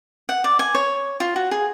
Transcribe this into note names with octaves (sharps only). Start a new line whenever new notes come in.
F#5
D5
G#5
C#5
F4
F#4
G#4